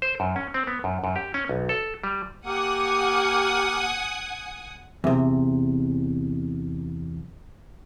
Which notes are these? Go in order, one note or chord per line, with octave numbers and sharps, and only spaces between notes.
C5
F#2
C#4
C4
B3
F#2
F#2
G4
C#4
B1
A4
G3
A#3 G4 F#5 G#5 D#6
E2 C3